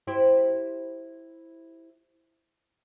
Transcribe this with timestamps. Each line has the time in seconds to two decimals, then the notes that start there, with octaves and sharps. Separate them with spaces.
0.07 E4 G4 C5